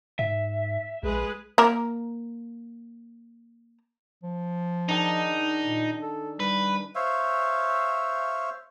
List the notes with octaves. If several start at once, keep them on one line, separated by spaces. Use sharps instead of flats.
G#2 E5
A#1 G#3 G#4 B4
A#3 A#4
F3
D#3 D4 D#4 G#4
A#2
A4
G3 B4
C5 C#5 E5 F5